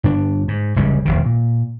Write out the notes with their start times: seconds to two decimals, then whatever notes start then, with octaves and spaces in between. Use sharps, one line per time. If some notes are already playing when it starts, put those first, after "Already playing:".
0.04 G2 D3 D4
0.48 G#2
0.76 F1 C#2 C#3 G3
1.05 E1 A#1 D#3
1.26 A#2